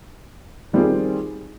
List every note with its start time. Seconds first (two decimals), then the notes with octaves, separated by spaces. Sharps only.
0.73 D#3 G3 C4 F4 G#4